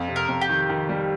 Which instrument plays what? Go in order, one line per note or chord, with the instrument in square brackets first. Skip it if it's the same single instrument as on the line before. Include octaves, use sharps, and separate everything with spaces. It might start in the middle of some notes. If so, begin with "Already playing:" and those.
Already playing: [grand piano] F2
C3
[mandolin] A#4
[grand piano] F2
[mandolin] G4
[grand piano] D#3
D#3
G3